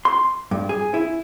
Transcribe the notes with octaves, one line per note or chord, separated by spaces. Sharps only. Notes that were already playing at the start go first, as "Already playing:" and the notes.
C6
G2
G#4
E4